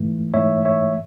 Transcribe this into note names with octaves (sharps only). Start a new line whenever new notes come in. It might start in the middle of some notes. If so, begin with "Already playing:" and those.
Already playing: G#2 E3 A3
G#2 E3 A3 C#5 E5
C#5 E5